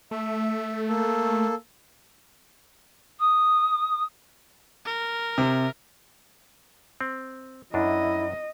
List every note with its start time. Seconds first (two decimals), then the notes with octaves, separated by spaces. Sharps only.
0.11 A3 E5
0.88 A#3 A4
3.19 D#6
4.85 A#4
5.38 C3
7.01 C4
7.74 F#2 D4 E4 D#5